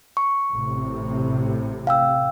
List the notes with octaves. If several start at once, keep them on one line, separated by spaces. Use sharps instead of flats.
C#6
A1 A2 C3
F5 G5 E6